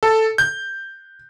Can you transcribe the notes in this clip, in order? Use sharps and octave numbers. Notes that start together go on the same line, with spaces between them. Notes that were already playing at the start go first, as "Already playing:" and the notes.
A4
G6